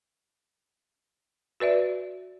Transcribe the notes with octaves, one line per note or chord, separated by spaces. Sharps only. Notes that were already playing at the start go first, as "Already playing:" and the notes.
F#4 B4 D5 E5